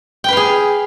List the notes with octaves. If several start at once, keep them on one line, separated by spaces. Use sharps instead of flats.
G#4 B4 F5 G5